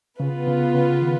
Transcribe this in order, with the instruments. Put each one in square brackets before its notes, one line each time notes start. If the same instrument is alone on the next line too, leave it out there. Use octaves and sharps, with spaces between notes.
[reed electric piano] C#3 [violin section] B3 F4 B4
[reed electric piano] C#3
C#3
D#3